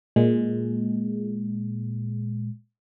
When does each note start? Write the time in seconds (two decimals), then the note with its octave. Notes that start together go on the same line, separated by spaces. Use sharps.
0.16 A#2 G#3